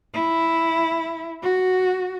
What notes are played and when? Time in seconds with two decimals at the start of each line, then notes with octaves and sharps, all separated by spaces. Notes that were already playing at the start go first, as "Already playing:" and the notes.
0.14 E4
1.43 F#4